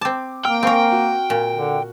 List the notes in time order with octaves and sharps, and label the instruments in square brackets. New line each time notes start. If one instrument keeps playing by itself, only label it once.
[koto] C4 A5 [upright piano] D6
[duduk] A#3 [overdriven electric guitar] G5 [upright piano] F6
[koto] C4 A#4 [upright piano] F5 G#5 C#6
[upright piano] F#4
[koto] A#2
[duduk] D3